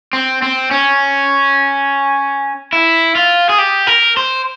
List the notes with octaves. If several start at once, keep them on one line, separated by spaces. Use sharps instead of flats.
C4
C4
C#4
E4
F4
G#4
G4
A#4
C5